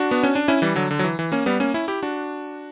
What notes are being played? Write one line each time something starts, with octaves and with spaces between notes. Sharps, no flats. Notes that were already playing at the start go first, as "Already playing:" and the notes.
Already playing: D4 F#4
B3
C#4
D4
C#4 E4
E3 G3
D3 F#3
D3
F#3
E3
E3
A#3 C#4
G3 B3
A#3 C#4
C#4 E4
E4 G4
D4 F#4